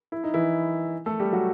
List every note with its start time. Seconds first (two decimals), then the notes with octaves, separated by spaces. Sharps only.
0.12 E4
0.24 D#4
0.34 E3 E4
1.06 A3 A4
1.20 G3 G4
1.33 F#3 F#4